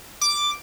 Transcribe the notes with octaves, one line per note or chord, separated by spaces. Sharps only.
D6